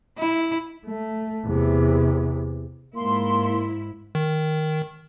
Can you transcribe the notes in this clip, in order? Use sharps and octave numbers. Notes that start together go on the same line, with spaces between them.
E4
A3
E2 C3
G#2 A#3 E4 C6
D#3